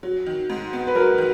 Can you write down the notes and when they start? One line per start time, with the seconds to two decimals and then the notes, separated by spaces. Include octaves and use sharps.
0.03 F#3
0.26 D#3
0.50 G#2
0.73 B3
0.87 B4
0.95 F#3 A#4
1.18 D#3